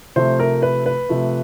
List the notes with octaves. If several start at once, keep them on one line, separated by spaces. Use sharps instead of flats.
C3 F3 A3 C5
A#4
B4
B4
C3 F3 A3